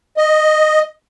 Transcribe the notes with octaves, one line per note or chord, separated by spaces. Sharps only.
D#5